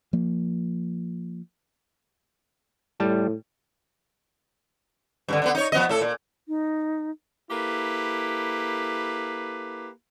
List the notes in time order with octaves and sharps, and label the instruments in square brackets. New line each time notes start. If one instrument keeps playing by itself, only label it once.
[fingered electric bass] F3 A#3
[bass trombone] A2 [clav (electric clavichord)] G3 A5
[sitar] G2 A#2 D3
D3 F3 B3
D#4 C#5
F3 B3 D#5
A2 A4
A#2
[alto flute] D#4
[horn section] A#3 E4 G4 A4 B4